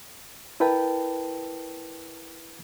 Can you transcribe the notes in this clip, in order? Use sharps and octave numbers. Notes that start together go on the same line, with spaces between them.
E4 A#4 B4 G5 A5